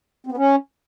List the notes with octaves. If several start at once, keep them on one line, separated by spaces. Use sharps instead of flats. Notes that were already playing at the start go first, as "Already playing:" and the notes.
C4
B3
C#4